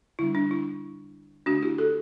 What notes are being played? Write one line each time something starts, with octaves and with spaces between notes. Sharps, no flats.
D3 G3 D4 E4
D4
E4
D3 A3 D4 F#4
E4 G4
F#4 A4